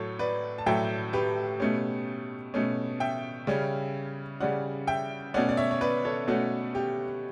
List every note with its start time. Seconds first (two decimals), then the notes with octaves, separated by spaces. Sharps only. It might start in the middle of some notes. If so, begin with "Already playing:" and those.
Already playing: A2 F#3 A3 A4 C#5
0.19 B4 D5
0.58 A5
0.66 A2 F#3 A3 E5 G5
1.13 G4 B4
1.60 B2 A3 C#4
2.54 B2 A3 C#4
3.00 E5 G5
3.47 C#3 G3 C#4
4.40 C#3 G3 C#4 D5 F#5
4.87 E5 G5
5.34 B2 A3 C#4 D5 F#5
5.49 D5
5.57 C#5 E5
5.71 C#5
5.81 B4 D5
6.04 A4 C#5
6.27 B2 A3 C#4 F#4 A4
6.75 G4